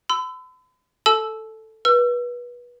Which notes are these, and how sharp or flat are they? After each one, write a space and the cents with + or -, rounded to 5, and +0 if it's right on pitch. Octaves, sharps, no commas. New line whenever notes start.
B5 +45 E6 +0
A4 +5 A5 -35 E6 +0
B4 -25 E6 +35